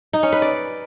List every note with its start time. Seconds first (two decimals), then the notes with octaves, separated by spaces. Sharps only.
0.13 D#4
0.23 C#4
0.32 B4
0.42 D5